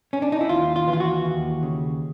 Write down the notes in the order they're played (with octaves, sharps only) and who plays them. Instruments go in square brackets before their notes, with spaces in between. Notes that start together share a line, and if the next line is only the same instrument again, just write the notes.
[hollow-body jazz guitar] C#4
D4
D#4
E4
D#2 F4
F4
E3
F4
F#4
D#2
C#3